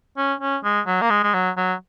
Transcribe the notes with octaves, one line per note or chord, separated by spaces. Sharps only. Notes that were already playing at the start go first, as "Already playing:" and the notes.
C#4
C#4
G#3
F#3
A#3
G#3
G#3
F#3
F#3